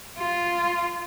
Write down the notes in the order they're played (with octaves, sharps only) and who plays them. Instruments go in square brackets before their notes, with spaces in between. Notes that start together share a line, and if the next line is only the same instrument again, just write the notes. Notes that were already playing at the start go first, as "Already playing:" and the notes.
[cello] F4